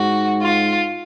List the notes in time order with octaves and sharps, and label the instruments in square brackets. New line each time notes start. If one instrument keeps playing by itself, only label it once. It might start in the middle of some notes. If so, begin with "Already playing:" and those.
Already playing: [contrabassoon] G#2 [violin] F#4
[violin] F4